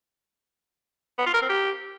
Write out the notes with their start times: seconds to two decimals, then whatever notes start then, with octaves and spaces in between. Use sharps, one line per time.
1.18 B3
1.26 F4
1.34 A#4
1.42 C4
1.49 G4